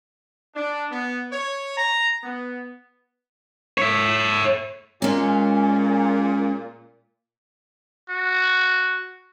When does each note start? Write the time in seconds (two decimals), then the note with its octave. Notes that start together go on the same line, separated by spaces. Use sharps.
0.55 D4
0.90 B3
1.32 C#5
1.77 A#5
2.23 B3
3.78 C#5 E5
5.02 A#2 G#3 C#4
8.10 F#4